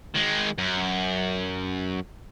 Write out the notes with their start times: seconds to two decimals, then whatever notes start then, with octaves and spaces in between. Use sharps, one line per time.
0.14 D#3 G#3
0.58 F#2